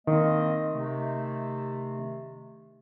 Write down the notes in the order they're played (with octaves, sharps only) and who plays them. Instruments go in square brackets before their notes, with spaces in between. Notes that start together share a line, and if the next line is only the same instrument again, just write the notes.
[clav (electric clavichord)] D#3 [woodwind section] A#3 C4 D#5
[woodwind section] C3 A3